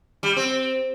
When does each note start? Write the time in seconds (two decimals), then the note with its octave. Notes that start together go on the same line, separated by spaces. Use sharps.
0.23 G3
0.36 C4